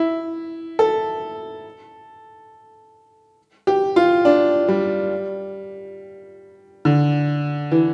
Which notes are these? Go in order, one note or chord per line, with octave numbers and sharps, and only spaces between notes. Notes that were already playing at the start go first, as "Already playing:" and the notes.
Already playing: E4
A4
G4
F4
D4
G3
D3
E3